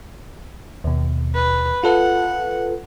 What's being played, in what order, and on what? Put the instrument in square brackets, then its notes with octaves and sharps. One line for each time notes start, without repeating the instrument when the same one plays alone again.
[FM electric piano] D#2 B2
[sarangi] B4
[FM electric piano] F4 A4 B4 [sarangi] F#5